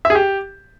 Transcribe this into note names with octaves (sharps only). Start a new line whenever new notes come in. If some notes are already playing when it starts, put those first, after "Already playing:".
E5
G#4
G4